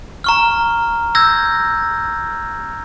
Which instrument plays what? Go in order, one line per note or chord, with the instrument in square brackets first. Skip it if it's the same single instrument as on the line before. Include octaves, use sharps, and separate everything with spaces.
[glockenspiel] A#5 C#6 F6
E6 G6 G#6 A#6